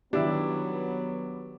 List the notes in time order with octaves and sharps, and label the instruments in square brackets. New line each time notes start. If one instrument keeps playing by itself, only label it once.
[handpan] D#3 G4 [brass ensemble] F#3 B3 [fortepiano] D4 E4